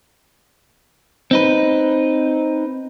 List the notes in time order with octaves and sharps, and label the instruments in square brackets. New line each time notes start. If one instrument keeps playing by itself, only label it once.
[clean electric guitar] C4 D#4 B4